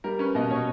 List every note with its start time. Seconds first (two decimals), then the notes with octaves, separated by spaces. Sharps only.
0.04 G3 A#4
0.19 C#4 B4
0.35 B2 D#5
0.50 B2 C#5